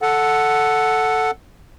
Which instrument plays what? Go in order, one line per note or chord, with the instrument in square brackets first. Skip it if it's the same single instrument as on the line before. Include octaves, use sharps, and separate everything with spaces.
[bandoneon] A4 F#5